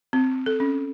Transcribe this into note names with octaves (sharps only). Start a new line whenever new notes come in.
C4
A4
C#4